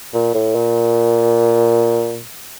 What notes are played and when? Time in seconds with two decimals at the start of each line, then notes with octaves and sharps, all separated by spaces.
0.14 A#2
0.34 A2
0.55 A#2